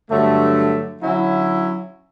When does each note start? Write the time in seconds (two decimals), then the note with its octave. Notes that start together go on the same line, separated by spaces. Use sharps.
0.10 G2 D3 F#3 A3
1.01 D3 F#3 C#4 E4